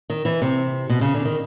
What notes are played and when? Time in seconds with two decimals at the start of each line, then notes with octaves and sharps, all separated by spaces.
0.10 D#3
0.25 E3
0.42 C3
0.89 B2
1.01 C#3
1.14 D3
1.25 D#3